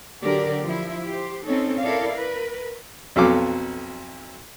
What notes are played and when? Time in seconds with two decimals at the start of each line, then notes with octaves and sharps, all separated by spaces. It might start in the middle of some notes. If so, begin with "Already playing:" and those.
0.22 D3 F#3 G4 A#4 D5
0.64 F3 E4
1.05 G4 C5
1.45 C4 C#4 D#4 A4
1.81 E4 A4 A#4 D5 F5
2.16 A#4 B4
3.16 B1 F2 F#3 A4 F5 D6